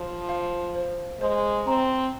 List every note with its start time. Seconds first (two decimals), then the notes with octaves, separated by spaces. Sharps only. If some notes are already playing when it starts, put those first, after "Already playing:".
Already playing: F3 C5
0.29 F5
0.75 C5
1.20 G#3 C5
1.67 C4 A#5